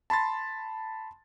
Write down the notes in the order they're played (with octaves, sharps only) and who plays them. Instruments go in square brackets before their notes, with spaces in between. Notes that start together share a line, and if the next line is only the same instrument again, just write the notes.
[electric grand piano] A5 B5 C6 A6